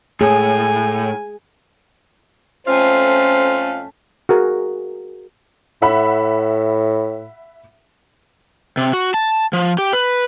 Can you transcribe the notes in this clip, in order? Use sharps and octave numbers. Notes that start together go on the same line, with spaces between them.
A2 G#4 G#5
F2 A3 C#4 F4 C5 F5
F#4 G#4 A#4
A2 E5 F#5 B5
C3
F#4
A5
F3
G4
B4